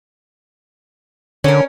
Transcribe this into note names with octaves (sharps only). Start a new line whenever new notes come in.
D3 C#4 A#4